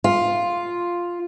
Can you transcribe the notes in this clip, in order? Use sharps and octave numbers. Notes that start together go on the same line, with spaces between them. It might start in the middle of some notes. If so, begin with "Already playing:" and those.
F4